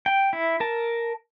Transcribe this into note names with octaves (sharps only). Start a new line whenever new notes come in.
G5
E4
A#4 A5